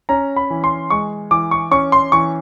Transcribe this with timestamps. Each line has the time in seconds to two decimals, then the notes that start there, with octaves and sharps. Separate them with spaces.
0.09 C#4 A#5
0.36 B5
0.50 E3
0.64 C6
0.90 G#3 C#6
1.31 E3 D6
1.51 C#6
1.71 C#4 C#6
1.92 C6
2.12 E3 C#6